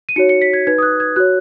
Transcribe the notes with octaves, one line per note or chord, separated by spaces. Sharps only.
D#7
D#4 F#4 C#5 C#7
C#7
B6
G#6
D#4 B4 G#6
D#6
F#6
G#6
F#4 C#5 F#6